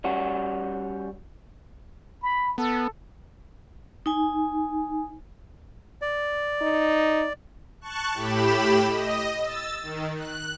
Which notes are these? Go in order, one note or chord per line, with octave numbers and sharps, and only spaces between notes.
G3 C#4 F#4
B5
B3 A4
D#4 G#5
D5
D#4
A5 C#6 F#6
A2 G4 B5 E7
D#5
E6 A6
D#3
F#6